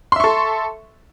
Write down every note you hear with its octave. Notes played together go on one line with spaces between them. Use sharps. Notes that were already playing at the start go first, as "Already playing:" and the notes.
A4 E5 C6 C#6